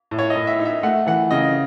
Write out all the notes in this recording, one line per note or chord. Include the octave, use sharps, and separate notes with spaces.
A2
C#5
D#5
A2
E5
D#4
E5
A3 F#5
E3 F#5
C#3 D#5